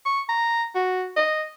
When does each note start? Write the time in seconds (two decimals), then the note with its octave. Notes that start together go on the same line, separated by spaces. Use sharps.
0.05 C#6
0.29 A#5
0.75 F#4
1.16 D#5